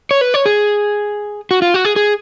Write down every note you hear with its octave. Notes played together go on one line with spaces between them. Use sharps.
C#5
B4
C#5
G#4
F#4
F4
F#4
G#4
G#4